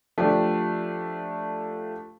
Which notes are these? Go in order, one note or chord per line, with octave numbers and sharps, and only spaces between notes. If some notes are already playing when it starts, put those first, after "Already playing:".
F3 A3 D4 G4